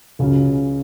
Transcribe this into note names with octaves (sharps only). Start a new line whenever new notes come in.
C#2 C#3 F#3 C#4